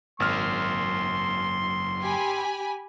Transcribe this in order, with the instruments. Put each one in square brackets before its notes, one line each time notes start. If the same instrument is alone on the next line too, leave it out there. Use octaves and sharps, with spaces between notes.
[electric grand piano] G#1 F6 [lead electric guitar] F#2 A#3 [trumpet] C6
[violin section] G4 G#5 B5